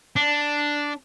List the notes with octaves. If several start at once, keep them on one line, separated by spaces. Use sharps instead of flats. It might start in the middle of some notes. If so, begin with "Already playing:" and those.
D4